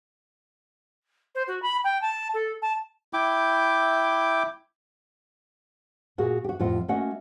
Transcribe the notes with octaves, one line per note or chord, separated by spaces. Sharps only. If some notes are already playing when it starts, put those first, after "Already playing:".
C5
F#4
B5
G5
A5
A4
A5
E4 G5 D6
A#2 F#4 G#4 A#4 F#5
F#4 G4
F2 A2 F4 D#5 F#5
A3 A#3 C#4 F#4 D#5 F#5